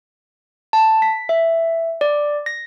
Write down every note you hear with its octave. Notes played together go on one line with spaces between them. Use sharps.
A5
B6
E5
D5
A#6